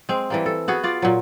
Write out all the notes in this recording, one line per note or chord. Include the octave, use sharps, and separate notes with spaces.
G#3 C4
E3 G3 A#3
A4
B3 F#4 G#4
F4 D5
A#2 F#3